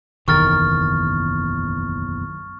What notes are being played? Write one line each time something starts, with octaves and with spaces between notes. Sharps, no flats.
F#1 B1 E2 D#3 A#4 C#6 F6 A6